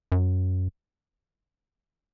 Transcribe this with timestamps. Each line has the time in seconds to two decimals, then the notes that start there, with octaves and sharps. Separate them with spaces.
0.12 F#2